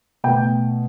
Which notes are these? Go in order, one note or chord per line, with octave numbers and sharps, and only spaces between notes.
B2 A3 G5